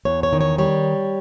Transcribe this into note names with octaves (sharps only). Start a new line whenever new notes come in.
E2 C#5
C#5
D#3
C#5
G3 C#5